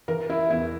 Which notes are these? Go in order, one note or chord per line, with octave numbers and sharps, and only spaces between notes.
E3 A#4
E4
E2 E4